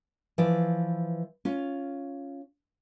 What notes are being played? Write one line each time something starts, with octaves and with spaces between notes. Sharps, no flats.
E3 F3 E4 D5
C#4 F4